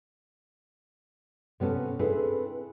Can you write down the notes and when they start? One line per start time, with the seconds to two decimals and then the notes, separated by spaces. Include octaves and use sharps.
1.60 C3 B3 C#4 A4
1.99 C4 D4 E4 G#4 A4 B4